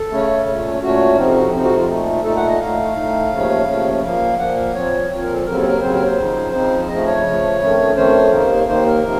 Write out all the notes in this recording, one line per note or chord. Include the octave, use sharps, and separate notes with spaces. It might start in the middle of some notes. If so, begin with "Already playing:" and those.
Already playing: A4
C#3 A3 C#4
A#2 A3 C#4
A#2 A3 C#4 F#4
F2 C3 F3 C4 D#4
F#4
F2 C3 F3 C4 D#4
F#4
F4
A#2 A3 D#4
A#2 A3 D#4 A4
F#5
D#5
A2 A3 D#4 F5
A2 A3 D#4
D#2 C#3 F3 A3 C#4
D#2 C#3 F3 A3 C#4
A#2 F3 A#3 F5
A#2 F3 A#3 F#5
F5
A#2 F3 C4 C#5
A#2 F3 C4 C#5
A#4
A4
D#2 C#3 F#3 C4 A#4
A4
A#4
D#2 C#3 F#3 C4 C5
A#4
C5
C#3 F3 C4 D#4
C#3 F3 C4 D#4
C#3 F3 A3 D#5
C#5
C#3 F3 A3
F2 D#3 A3 C#4
F2 D#3 A3 C#4 C5
D#2 D#3 A#3 D#4
D#2 D#3 A#3 D#4 C5
A#4
C3 F3 A#3